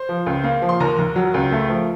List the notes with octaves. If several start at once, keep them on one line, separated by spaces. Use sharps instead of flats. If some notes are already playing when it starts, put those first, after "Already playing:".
Already playing: C5 C6
F3
C#2
A#3
F3
C6
D#2 A#4 A#5
D#2
F#3
C#2
A3
F3